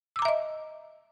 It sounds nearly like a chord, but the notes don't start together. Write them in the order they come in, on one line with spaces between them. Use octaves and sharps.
E6 D6 A#5 E5 D#5